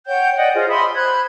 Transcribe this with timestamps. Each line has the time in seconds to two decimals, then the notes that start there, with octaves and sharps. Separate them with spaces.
0.07 C#5 F#5 G5 G6
0.37 D5 D#5 F#5 G5
0.54 F4 G#4 C5 D#5
0.68 E5 B5 C6 D#6
0.95 C5 B5 F#6 G#6